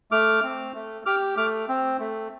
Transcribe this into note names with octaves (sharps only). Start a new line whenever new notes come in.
A3 D6 F6
C4
A3
G4 D6 F6
A3 D6 F6
C4
A3